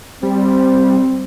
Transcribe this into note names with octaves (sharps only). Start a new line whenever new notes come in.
G3 C4